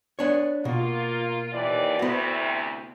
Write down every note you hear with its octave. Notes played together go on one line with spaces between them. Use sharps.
B3 D4 C#5
B2 A#3 F4
D#2 E3 D5
D2 C3 B3 E4 F#4